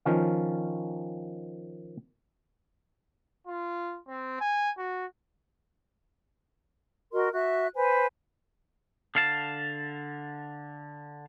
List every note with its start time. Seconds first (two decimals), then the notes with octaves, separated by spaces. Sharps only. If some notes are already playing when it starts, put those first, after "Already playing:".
0.05 D#3 F3 C#4 F5
3.47 F4
4.08 C4
4.40 G#5
4.77 F#4
7.13 F#4 A#4 D#5 C6
7.33 F#4 E5 F#6
7.76 B4 C5 G#5
9.15 D3 F5 A5